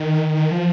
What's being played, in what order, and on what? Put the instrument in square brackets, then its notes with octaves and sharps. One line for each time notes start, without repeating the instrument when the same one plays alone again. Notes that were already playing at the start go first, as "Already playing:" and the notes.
Already playing: [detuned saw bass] D#3
F3